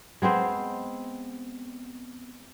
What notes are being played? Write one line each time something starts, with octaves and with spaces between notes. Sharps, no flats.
G#3 B3 C4 C5